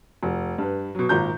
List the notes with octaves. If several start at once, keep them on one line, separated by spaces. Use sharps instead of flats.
F1
G2 B4
B2 F#3
G#1 A#2 A#5 G6